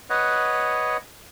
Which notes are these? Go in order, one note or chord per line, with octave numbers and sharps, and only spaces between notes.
B4 C#5 D#5 F#5